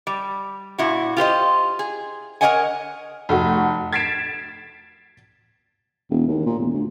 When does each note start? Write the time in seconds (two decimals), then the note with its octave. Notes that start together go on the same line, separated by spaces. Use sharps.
0.07 G3
0.78 A#2 E4 F#4
1.17 F4 G4 C5 D#5
1.79 G#4
2.41 A#4 B4 C#5 D#5 F#5 G#5
3.29 F1 A3 F#4
3.93 G#6 A6 B6 C7 D7 E7
6.10 E1
6.28 D#2
6.46 A#2
6.59 E1
6.73 D2